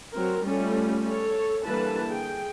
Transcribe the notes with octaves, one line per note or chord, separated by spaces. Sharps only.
F#3 C4 A#4
G3 A3 C#4 F4 A4
A4 C#5
D3 E3 G3 A#3 B4 A5
G#4 G5